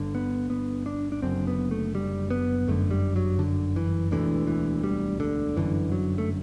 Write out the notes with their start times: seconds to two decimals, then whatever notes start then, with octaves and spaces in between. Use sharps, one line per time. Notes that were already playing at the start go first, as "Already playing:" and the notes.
Already playing: G1 G2 D3
0.15 B3
0.50 B3
0.86 D4
1.12 D4
1.22 F#1 F#2 D3 C4
1.47 B3
1.71 A3
1.95 G3
2.31 B3
2.68 G1 F#2 D3 A3
2.91 G3
3.16 F#3
3.39 D3
3.76 E3
4.11 E1 D2 D3 E3
4.47 E3
4.84 G3
5.20 D3
5.56 G1 F#2 D3 E3
5.92 F#3
6.18 A3